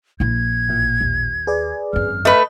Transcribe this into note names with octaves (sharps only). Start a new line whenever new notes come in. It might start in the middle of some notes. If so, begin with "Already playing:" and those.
A#1 E4 G#6
A1 A#2
D#2
G#4 B4 D5
G#1 F#2 F6
A3 B4 D#5